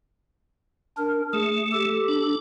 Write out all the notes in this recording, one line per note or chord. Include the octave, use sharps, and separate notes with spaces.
D4 A#4
A3 G#4
G4 A4
D4